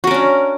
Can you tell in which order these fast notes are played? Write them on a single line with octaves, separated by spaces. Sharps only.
F#4 A#4 C#4 D4